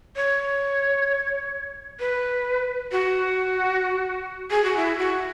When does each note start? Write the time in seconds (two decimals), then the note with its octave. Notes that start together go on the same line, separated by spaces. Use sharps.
0.16 C#5
2.00 B4
2.92 F#4
4.51 G#4
4.64 F#4
4.77 E4
4.99 F#4